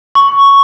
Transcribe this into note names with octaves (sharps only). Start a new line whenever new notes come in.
C#6